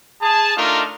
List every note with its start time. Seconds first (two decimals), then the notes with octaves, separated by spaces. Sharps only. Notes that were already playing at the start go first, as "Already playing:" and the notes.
0.22 G#4 A5
0.57 A3 D4 D#4 F4 A#4